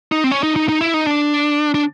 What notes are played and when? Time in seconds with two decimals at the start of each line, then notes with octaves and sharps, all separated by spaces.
0.12 D#4
0.24 C4
0.31 C#4
0.43 D#4
0.56 D#4
0.69 D#4
0.81 E4
0.94 D#4
1.06 D4
1.74 D4